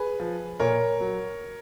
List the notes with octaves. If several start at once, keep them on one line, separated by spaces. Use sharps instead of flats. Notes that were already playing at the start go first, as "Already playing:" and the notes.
Already playing: G#4 B4
F3
A#2 A#4 C#5
F#3